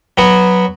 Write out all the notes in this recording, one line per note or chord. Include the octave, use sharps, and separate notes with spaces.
F#3 B3 F#4